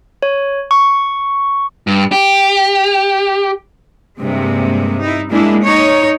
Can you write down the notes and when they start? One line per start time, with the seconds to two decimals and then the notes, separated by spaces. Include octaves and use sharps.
0.22 C#5
0.71 C#6
1.87 G2
2.12 G4
4.19 G2 C3 G#3 A#3
5.00 D#4 E4
5.31 G#3 A#3 D4 E4
5.64 D#4 C#5